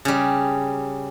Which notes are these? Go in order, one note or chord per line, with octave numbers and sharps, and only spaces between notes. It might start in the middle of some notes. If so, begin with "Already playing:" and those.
C#3 G3